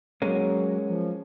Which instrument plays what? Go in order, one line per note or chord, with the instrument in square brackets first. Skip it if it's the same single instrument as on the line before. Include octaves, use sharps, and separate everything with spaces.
[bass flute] F#3 [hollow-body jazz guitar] G#3 A#3 C#4
[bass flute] F3